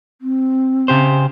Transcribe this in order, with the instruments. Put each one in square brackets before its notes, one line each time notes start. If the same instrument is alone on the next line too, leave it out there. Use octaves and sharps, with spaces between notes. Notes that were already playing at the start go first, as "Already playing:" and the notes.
[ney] C4
[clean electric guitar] C#3 G4 C5